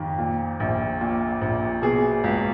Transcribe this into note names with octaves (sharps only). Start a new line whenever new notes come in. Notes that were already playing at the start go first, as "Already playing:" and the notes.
Already playing: F2 D#3
A#2
A#1
A#2
A#1
B2 G#4
C#2